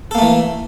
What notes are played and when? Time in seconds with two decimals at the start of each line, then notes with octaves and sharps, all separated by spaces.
0.11 A4
0.15 A#3
0.18 A3
0.22 E3